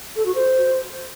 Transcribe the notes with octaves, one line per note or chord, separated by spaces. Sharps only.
A4
F#4
C5